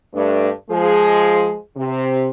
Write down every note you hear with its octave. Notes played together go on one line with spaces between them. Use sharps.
G2 A3 D4
F3 G#3 G#4
C3